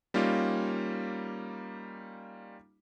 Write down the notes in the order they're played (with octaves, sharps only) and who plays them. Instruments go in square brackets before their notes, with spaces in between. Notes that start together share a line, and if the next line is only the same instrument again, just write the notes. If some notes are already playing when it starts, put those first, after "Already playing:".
[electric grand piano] G3 A#3 C#4 D#4 F4